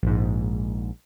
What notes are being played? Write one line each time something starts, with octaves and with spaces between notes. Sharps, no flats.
A#1 G#2